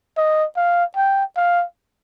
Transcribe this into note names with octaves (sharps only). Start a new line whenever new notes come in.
D#5
F5
G5
F5